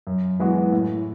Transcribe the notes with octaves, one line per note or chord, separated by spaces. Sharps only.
F#2
E3 G#3 B3 F#4
A2